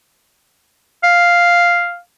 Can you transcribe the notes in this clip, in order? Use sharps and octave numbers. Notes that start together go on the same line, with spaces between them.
F5